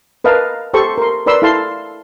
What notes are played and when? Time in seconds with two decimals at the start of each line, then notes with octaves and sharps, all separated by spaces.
0.24 A#4 B4 D#5 F5 A5
0.74 G4 A4 C5 C#6
0.98 A#4 C6
1.26 A#4 B4 D5 B5 C6 E6
1.42 E4 A4 F5 A5 C6